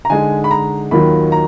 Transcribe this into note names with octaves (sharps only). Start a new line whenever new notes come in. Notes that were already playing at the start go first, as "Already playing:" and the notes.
A#5
D3 G#3 D#4 G#5
B5
A#5
D#2 D#3 F#3 A#3 F4 B5
A#5